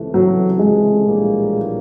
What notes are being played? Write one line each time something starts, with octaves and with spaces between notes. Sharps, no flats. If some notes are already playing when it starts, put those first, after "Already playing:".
Already playing: C#2 C3 E3 A3
F#3
G#3
A#1 A2 E3 G3 A#3